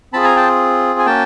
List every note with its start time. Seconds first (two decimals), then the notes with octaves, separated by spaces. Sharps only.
0.13 C4 F4 G#4 A5 B5
0.24 G#5 A#5
0.36 G5 A5
0.99 G#5
1.06 A#3 C#4 F#4 G5 A5